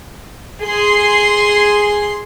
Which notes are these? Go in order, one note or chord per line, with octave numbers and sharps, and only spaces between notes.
G#4 C6